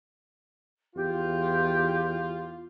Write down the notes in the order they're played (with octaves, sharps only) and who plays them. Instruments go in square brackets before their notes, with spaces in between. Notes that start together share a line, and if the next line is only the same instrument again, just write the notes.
[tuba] E2 [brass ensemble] F4 [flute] G4